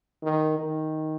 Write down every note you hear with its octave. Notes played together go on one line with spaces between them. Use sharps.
D#3
D#3